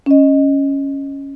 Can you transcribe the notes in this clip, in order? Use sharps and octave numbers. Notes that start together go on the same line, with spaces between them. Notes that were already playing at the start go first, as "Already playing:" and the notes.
C#4 D#5